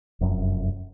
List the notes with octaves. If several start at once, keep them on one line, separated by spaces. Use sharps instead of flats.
F1 F#2